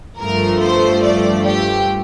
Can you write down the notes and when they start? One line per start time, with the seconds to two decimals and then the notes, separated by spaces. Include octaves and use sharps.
0.19 G2 F3 A3 A#4
0.62 C5
1.03 D5
1.47 G4